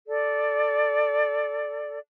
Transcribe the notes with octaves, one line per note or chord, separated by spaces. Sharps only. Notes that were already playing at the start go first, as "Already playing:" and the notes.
A4 D5